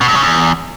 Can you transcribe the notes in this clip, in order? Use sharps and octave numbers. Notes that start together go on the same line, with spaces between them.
B2
G2
C#3
E2